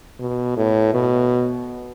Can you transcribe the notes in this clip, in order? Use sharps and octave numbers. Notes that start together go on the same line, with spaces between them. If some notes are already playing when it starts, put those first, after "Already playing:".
B2
A2
B2